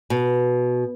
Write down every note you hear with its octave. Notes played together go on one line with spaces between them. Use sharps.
B2